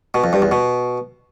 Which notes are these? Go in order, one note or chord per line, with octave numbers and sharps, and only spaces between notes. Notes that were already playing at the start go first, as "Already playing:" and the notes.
B2
F2
G2
E2
B2